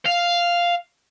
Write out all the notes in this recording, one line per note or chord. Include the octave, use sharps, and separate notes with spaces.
F5